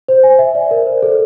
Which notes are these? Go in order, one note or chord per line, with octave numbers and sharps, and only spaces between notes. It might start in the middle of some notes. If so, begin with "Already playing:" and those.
C5
G#5
E5
D5
A#4
C5
A4